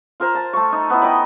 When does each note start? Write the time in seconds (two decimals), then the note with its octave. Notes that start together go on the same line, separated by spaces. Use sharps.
0.20 F4 A#4 C5
0.35 A5
0.53 A3 C#6
0.72 D#4
0.90 B3 D#4 E4
1.02 D#5 G5 B5